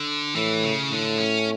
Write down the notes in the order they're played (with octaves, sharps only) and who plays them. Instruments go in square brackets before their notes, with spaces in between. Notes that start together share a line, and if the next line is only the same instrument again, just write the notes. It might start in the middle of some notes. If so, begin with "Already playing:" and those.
Already playing: [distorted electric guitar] D3
[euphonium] A2 [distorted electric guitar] E3
[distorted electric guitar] C#3
[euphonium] A2 [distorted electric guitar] D3
[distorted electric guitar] C#4